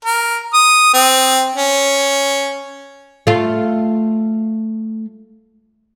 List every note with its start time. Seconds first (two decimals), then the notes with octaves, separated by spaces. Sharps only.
0.05 A#4
0.54 D#6
0.94 C4
1.56 C#4
3.27 A3 F4